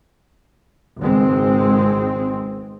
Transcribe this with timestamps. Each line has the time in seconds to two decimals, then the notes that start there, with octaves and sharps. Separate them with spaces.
0.98 G#1 C#2 G#3 C4